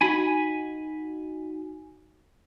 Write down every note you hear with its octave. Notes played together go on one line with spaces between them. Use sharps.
D#4 F#4 G#5 B5